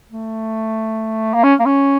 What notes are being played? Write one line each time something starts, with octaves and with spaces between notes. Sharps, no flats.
A3
A#3
C#4
A#3
C#4